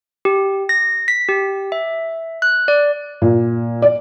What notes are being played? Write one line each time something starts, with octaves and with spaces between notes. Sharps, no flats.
G4
A#6
B6
G4
E5
F#6
D5
A#2
D5